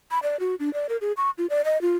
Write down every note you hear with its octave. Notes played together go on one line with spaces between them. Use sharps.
B5
D5
F#4
D4
D5
A#4
G#4
C#6
F4
D5
D#5
F4